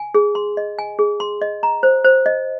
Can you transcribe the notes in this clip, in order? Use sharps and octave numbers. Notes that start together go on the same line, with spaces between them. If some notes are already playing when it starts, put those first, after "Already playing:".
Already playing: G#5
G#4
C6
D#5
G#5
G#4
C6
D#5
A#5
C5
C5
D#5